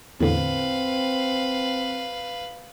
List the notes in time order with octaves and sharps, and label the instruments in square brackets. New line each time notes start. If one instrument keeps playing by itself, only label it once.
[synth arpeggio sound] E2 A2 D3 [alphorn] C4 [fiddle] B4 F5